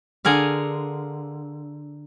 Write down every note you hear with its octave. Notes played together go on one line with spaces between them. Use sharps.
D3 G#4 A#4 F5